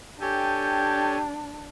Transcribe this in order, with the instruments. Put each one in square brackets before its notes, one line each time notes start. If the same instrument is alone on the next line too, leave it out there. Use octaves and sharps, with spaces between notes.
[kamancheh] D4 [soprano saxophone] G4 [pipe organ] A4 C#5 G#5 [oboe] G5